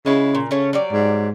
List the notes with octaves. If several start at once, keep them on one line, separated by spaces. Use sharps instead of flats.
C#3 G#3 E4
A#2
C#3 A3 C#4 C#5
F#3 G3 D5
G#2